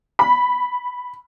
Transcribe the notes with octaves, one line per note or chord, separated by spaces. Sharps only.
B5